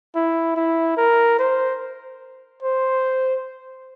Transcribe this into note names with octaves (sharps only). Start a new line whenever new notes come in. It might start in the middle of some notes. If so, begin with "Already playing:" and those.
E4
E4
A#4
C5
C5